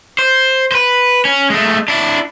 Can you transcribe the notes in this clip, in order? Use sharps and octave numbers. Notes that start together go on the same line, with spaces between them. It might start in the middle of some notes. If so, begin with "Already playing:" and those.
C5
B4 C5
C#4
G#3 A3
D4 E4